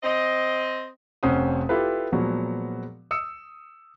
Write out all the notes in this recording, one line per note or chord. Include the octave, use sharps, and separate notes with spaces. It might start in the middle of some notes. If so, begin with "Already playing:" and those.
C4 D#5
F1 F2 C#4 C5 F#5 D#6
E4 F4 G4 A4 B4
A#2 F3 F#3 G#3 B3 F#4
D#6 E6 C#7